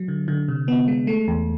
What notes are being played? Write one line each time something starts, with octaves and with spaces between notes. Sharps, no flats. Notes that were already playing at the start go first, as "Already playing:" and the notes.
Already playing: F#3
D3
D3
C3
B3
G#3
A3
E2